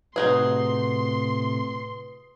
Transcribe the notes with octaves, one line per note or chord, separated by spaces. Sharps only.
A2 C3 D#4 F#4 G#4 B4 C6 D#6